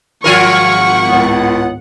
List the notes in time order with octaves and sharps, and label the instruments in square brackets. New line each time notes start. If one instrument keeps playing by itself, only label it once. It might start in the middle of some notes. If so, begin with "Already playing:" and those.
[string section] G#1 F#5 [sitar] F3 F4 A#4 [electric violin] C#6
[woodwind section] C#2 A2 B3